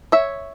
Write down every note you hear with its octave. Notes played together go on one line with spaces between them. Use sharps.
C#5 E5